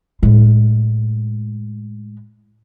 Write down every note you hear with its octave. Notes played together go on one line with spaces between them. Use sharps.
A2 G#3